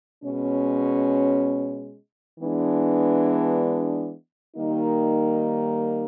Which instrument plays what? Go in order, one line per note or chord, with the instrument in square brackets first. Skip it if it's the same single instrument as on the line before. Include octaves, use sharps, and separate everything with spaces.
[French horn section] B2 G#3 C#4
E3 G#3 B3 D4
D#3 G3 A#3 D#4